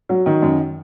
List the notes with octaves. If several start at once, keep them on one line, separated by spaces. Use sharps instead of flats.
F#3
D#3
F#2